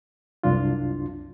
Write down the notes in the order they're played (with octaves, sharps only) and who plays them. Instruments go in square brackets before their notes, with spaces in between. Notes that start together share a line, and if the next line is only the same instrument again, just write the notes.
[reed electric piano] C2 F#2 D4 F4